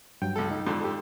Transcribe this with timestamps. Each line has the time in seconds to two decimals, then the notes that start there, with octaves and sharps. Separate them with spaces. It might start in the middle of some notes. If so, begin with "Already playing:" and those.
0.22 G2 F#3 G5
0.36 C#2 A4
0.51 D#4
0.67 F2 G#2 D3
0.84 G4